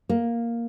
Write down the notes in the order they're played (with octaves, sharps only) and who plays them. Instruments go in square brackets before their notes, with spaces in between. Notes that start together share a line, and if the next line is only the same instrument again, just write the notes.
[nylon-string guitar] A#3